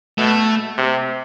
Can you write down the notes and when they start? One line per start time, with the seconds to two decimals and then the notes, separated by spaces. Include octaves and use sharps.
0.18 B2 A3
0.78 C3